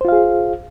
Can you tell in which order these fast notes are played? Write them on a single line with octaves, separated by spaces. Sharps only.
C5 F4 F5 G#4